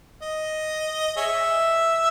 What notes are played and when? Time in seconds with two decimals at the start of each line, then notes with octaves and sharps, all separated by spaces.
0.22 D#5
1.16 G#4 C#5 E5